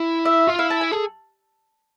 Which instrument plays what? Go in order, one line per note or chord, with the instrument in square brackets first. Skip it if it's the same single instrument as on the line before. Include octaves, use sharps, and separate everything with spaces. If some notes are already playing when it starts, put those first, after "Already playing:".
Already playing: [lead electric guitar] E4
[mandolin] E5
[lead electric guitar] F4
[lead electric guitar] E4 [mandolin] F5
[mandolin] A5
G#5
[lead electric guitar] G#4 [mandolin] A4